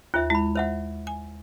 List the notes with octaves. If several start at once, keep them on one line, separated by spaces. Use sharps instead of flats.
D#2 F4 C5 E5
G#3 E4 B5
C5 E5 F#5
G#5